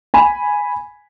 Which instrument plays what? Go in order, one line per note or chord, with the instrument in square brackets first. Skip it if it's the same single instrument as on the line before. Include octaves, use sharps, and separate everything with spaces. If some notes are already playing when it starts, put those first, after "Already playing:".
[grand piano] G#5 B5